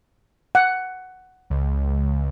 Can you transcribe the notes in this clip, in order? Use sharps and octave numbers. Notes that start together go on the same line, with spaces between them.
F#5
C#2